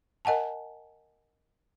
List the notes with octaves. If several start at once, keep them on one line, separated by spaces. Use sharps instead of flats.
A#4 D#5 F#5 G#5 A5